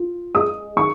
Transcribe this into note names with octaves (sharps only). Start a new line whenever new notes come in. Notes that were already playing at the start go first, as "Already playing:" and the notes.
Already playing: F4
G#3 D#6
D#3 C#6